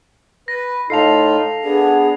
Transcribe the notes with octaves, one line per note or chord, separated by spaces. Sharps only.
B4 A#6
A2 D#4 F4 A4 F5 A5 C7 F7
B3 D4 G#4